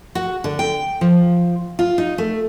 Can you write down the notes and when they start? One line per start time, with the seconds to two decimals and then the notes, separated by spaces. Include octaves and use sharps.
0.15 F#4
0.44 D3
0.59 G5
1.01 F3
1.79 F4
1.98 D#4
2.18 A3